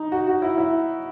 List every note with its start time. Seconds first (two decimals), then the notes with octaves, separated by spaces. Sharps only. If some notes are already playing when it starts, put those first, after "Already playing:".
Already playing: D#4
0.12 F#4
0.27 F#4
0.42 E4
0.58 E4